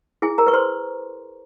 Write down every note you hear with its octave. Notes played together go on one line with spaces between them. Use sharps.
E4 G#4 G#5
A#4 A#5
B4 C#6
C5 C6